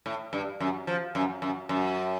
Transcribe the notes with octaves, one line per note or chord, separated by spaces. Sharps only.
A2
G2
F#2
F3
F#2
F#2
F#2